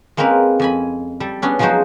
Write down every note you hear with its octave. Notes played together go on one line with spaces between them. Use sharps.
G#3 A#3 C4 C#4 A#4 B4
F2 G#5 B5
G3 A4
B3 C#4 D4
F3 F#3 G#3 D#4 F#4 C5